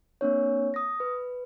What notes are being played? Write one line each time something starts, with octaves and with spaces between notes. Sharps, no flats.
A#3 C4 D4 C#5
D#6 A#6
B4